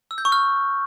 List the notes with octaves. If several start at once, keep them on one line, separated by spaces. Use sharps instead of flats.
E6
G6
C#6
F6